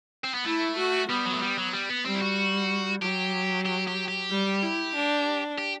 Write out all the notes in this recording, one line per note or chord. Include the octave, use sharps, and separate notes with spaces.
C4
B3
A3 E4
F#4
G3 B3
F#3
A3
G3
F#3
G3
B3
G3 C4
E4
F#4
F#3 G4
G4
G4
G4
G3
E4
D4
G4